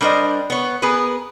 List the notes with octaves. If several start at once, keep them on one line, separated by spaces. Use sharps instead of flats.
G3 D4 A#4 C5 D#5
B3 C#5
B3 G#4 A#4 B4